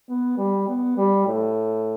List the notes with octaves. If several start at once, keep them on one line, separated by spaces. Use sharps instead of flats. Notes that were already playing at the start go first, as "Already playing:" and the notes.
B3
G3
B3
G3
A2